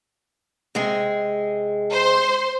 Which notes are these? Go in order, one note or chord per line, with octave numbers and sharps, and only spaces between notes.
C3 G#3 G#4
C5 C6